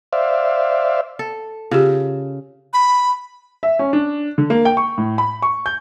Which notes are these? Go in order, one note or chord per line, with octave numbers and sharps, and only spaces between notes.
C5 D5 E5 F5
A4
C#3 F4 G4
B5
E5
C#4
D4
D3
A#3
G5
C#6
A2
B5
C#6
G6